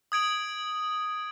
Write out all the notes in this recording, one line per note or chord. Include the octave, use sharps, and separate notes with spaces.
D#6 G#6 D7 F#7